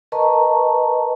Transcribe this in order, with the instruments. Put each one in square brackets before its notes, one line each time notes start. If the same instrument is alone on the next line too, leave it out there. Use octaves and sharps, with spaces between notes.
[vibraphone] A#4 B4 D#5 A5 A#5 C#6